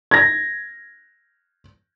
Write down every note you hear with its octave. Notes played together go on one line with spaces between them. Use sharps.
G#6 A#6